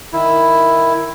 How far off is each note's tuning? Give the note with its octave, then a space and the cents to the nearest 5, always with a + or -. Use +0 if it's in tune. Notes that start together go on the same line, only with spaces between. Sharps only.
D#3 +0 E4 +0